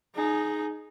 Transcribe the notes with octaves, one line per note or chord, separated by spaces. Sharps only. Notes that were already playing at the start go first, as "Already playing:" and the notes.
D#4 G#4